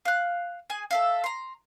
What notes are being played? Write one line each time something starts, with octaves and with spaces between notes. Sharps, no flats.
F5 F#6
G#4 G#5
A4 E5 F5
A#5 C6